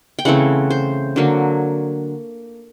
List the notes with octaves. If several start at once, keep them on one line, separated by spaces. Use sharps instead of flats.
G5
C#3 E3 A3 C4 F#5
C5
D3 F#3 A#3